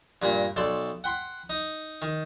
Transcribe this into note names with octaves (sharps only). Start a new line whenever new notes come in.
G2 A#2 A#3 B5
B1 A4 D5 C6
F#5 G5 B5 C6
D#4
D#3